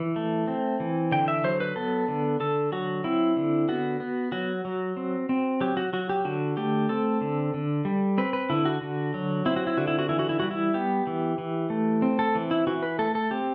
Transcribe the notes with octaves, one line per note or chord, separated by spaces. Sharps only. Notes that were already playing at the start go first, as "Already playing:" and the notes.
Already playing: E3
A3
C4
E3
D3 G5
E5
F#3 C5
B4
B3 A4
D3
D3 A4
F#3 F#4
C4 E4
D3
B3 F#4
B3
F#3 F#4
F#3
C4
C4
F#3 G4
F#4
F#3 F#4
G4
D3 F#4
A3 G4
C4 A4
D3
D3
G3
C4 B4
B4
D3 E4
F#4
D3
F#3
C4 E4
F#4
E4
D3 F#4
E4
F#4
E3 E4
F#4
E4
G3 F#4
E4
B3 G4
E3
E3
A3
C4
A4
E3
E4
E3 F#4
B4
A3 A4
A4
C4 G4